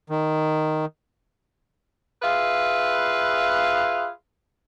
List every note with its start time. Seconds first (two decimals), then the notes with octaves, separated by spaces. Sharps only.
0.10 D#3
2.22 F4 G#4 B4 E5 F5